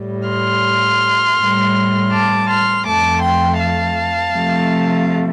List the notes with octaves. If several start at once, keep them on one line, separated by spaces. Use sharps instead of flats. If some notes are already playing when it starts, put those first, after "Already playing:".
Already playing: A2 G3
C6 F6
A2 G3
A5 D6
C6 F6
F2 F3 A3 A5 D6
G5 C6
F5 A5
C3 F3 A3